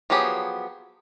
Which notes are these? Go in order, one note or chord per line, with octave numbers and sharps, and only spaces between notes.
F3 F#3 B3 G4 G#4